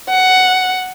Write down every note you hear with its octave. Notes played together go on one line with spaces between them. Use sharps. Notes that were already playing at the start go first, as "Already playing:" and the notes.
F#5